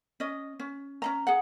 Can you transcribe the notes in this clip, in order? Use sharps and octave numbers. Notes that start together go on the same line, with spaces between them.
C#4 D#5
C#4
C#4 D4 A#5
G#4 F#5